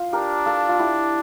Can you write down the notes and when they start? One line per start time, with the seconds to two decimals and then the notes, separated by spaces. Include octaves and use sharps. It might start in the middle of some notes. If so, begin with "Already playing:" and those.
Already playing: F4
0.13 D4 G4 A#4
0.46 F4 A4
0.69 F4
0.79 E4 G4